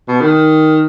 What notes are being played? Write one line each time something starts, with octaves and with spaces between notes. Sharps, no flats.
B2
D#3